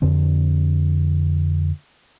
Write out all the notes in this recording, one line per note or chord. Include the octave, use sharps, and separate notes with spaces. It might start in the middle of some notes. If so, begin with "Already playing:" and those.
F2 D3 C4